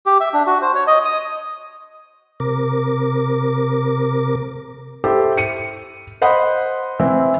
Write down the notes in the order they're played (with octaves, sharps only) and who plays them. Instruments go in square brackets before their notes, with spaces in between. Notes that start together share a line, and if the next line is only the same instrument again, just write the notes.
[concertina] G4
E5
D4
F#4
C5
C#5
D#5
D#6
[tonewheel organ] C3 A#4 D6
[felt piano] E4 G4 A4 C5
C#7 D#7
C5 D#5 F#5 B5 C6 D#6
E3 C4 E4